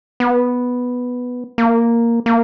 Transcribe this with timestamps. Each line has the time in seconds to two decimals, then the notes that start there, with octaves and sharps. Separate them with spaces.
0.20 B3
1.58 A#3
2.26 A#3